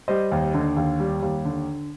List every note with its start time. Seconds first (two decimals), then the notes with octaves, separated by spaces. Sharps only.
0.08 G3 C5 D#5
0.32 D#2
0.54 D3
0.77 D#2
1.00 G3
1.22 D#2
1.45 D3